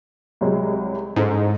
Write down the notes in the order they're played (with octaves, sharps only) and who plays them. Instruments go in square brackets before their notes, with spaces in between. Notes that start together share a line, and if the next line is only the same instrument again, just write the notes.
[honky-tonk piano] C2 F#3 G#3
[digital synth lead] G#2 [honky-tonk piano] D#4 A4 C5